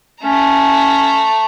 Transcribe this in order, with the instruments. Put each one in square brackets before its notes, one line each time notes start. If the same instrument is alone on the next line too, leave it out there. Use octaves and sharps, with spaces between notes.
[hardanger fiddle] A3 A#5 [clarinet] C#4